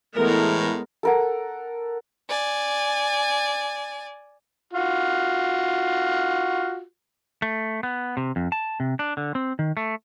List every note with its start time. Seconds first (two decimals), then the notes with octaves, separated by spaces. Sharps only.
0.17 A2 E3 G#3 A3 B3 E4 A#4
1.03 A4 A#4 F#5
2.29 D5 G#5
4.73 F4 F#4
7.42 A3
7.83 B3
8.17 C3
8.36 F2
8.52 A5
8.80 C3
8.99 D4
9.17 D3
9.35 C4
9.59 D#3
9.77 A3